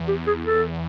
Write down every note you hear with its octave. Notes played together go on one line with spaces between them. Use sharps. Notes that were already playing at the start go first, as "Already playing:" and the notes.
Already playing: E2
G4
G#4
A4